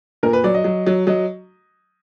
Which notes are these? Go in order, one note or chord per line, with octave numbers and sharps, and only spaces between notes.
A#2 A#4
B4
F#3 D5
D#5
F#3
F#3
F#3 D#5